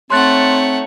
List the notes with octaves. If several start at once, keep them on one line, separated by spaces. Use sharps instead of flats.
A3 C4 D#4 C#5 F#5 C6 F#6 A6